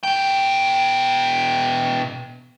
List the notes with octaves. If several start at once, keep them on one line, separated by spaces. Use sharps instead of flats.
B2 G5